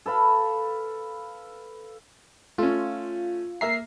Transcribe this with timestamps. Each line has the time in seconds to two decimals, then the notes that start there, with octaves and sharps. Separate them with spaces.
0.06 A4 B4 F5 B5
2.58 A3 C#4 F4
3.61 A#3 E5 A#5 C7